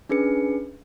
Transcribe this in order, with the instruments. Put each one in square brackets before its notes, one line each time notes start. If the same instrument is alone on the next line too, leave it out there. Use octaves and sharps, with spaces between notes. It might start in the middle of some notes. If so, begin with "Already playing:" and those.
[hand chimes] C#4 D4 G#4 B4 C#7